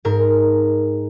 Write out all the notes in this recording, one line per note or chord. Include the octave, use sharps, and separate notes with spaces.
G#2 A#4